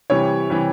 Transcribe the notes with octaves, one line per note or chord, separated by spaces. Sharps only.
C3 E3 G3 C#5
C3 E3 G3